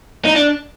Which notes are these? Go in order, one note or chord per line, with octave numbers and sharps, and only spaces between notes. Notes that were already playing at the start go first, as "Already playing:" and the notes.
D#4
D4